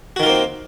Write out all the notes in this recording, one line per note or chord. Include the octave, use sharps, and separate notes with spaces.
D#3 A#3 C4 F4 F#4